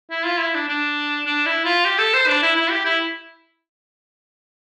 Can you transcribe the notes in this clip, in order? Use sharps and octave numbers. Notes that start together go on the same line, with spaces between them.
E4
F4
E4
D4
D4
D4
E4
F4
G4
A4
C5
D4
E4
E4
G4
E4